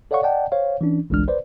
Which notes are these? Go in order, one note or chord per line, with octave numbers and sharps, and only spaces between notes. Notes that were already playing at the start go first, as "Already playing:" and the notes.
A4 C#5 D5 F5 F#5 C#6
D5 D#5 F#5 G5 A5
C5 C#5 F5
E3 C#4 D4
G1 C2 E3 G#3 D4 F6
B4 C5 D5